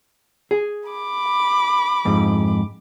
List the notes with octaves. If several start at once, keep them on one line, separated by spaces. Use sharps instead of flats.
G#4
B5 D6
F2 G#2